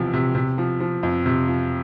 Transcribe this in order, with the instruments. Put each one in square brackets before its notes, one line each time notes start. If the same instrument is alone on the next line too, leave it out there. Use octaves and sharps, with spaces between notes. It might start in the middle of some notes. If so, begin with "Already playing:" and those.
Already playing: [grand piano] E1 E2 C3 F3
C3
C3
F3
F3
F2
C3
F3